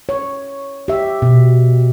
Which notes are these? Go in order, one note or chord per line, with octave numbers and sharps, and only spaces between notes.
C#5
G4 E5
B2